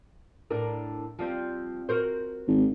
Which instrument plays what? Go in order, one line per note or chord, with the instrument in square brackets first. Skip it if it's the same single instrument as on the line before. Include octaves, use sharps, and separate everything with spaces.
[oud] A2 D4 A#4
F3 G3 C4
F#4 A#4 C5
[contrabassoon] G#1